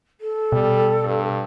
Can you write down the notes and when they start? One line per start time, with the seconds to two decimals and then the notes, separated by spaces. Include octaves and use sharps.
0.20 A4
0.52 B2 G3
1.05 G2